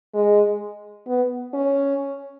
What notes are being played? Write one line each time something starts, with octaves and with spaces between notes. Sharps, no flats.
G#3
B3
C#4